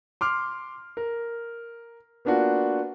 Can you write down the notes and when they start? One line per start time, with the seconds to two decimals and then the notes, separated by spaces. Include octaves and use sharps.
0.21 C6 D6 F6
0.97 A#4
2.25 A#3 B3 D4 F4 F#4